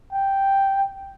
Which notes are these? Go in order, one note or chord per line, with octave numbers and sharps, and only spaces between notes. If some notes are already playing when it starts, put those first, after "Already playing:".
G5